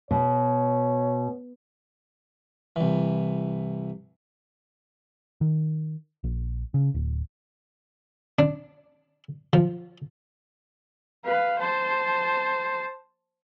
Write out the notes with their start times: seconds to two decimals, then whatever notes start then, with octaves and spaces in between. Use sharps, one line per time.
0.11 B2 C#5
2.76 C2 E3
5.41 D#3
6.24 A#1
6.74 C#3
6.95 D1
8.39 D4
9.53 F3
11.25 B4 F5
11.59 C5 A5